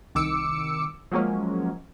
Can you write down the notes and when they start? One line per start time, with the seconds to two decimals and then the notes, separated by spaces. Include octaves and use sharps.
0.15 C2 D#3 D6 E6 C#7
1.12 F3 F#3 G#3 A#3 C#4